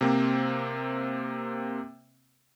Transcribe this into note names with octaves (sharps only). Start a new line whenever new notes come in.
C3 A#3 C4